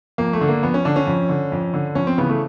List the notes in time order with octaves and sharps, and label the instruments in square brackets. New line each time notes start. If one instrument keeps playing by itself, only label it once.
[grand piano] F2 A#3
A3
D3
A#3
F2 B3
C#4
D3 D4
C#4
F2
D3
F2
D3
F2 C#4
C4
C#3 E3 B3
A3